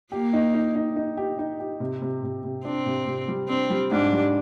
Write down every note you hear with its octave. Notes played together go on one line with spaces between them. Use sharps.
A#3 G4
D#4
D#4
D#4
D#4
G4
D#4
G4
C3
C3
C3
C3
C4 D4
C3
C3
G3
C4 D4
G3
G#2 D4
G3